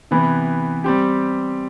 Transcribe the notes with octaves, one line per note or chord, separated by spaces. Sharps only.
C3 E3 B3 E4
G3 C4 G4